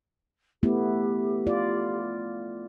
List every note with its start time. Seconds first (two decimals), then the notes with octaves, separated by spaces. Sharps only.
0.63 A3 B3 E4 G4
1.47 F4 D5